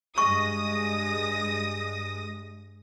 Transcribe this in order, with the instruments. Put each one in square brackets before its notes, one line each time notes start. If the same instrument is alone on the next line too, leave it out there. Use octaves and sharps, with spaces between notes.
[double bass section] G2 G#3 [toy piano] C#6 [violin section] D#6 A#6